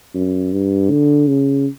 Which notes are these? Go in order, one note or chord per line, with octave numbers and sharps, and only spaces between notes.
F#2
G2
D3
C#3